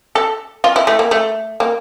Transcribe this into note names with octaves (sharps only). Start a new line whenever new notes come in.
A4
F4
E4
A3
A#3
A3
A#3